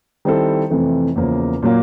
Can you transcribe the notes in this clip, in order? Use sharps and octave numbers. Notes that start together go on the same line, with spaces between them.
D#3 G3 C4 E4 A4
F2 C3 E3 A3
E2 C#3 F3 A#3
A#2 F#3 A#3